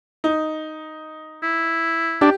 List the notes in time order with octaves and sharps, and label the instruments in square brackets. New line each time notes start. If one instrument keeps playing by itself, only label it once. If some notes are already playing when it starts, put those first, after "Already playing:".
[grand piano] D#4
[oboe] E4
[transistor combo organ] D4 [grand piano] G4